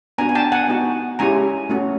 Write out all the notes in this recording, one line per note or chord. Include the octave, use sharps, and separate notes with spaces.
B3 D4 F#4 G#5 A#5
G#5
G5 A5
F#5 G#5
B3 D#4 F#4
G#3 C#4 E4 G4 G#5 A#5
A3 C#4 F#4